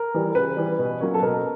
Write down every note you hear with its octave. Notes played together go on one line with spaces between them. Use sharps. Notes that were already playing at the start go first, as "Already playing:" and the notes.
Already playing: A#4
E3 G3
A#4
C#3 B4
E3 G3
B2
F#3 A#3 C#4
A4
B2 A#4